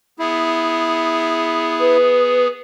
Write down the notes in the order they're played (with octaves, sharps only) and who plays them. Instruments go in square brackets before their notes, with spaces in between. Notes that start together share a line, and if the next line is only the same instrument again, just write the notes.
[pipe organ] B3 G#4 [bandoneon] E4
[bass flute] B4